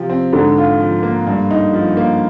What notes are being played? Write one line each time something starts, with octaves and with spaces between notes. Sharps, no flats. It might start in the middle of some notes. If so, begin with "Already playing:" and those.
Already playing: C3 F3 G4
C4
G#2 D3
F4
F3
A#3
G2
D#4
F3
A#3